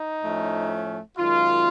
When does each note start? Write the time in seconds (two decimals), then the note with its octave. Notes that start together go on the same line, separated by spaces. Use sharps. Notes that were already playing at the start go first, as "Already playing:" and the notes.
Already playing: D#4
0.23 A2 F3 A3 C#4
1.18 F#2 D#3 G#3 F4